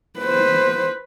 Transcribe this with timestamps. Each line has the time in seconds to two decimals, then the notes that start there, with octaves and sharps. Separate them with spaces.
0.19 B4 C5